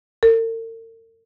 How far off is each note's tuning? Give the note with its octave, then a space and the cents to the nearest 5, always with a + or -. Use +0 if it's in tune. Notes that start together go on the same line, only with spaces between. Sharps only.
A#4 -45